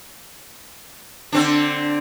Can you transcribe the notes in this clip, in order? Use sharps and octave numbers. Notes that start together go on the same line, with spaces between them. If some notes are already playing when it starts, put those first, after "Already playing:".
D3 C4 D4